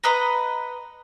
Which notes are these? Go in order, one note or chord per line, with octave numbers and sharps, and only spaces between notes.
B4 D#5 F#5 A#5